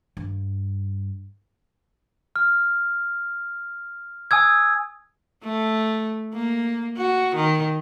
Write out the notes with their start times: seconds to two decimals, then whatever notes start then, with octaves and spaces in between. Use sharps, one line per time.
0.17 G2
2.36 F6
4.31 G#5 D#6 E6 G#6
5.44 A3
6.34 A#3
6.97 F#4
7.35 D#3